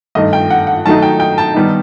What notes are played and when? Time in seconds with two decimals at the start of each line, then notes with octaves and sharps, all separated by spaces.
0.15 G2 D#3 A3 D#5
0.33 G5
0.50 F#5
0.67 F#5
0.85 D#3 F#3 A3 D#4 A5
1.02 G5
1.20 G5
1.38 A5
1.54 D#3 G3 B3 D#4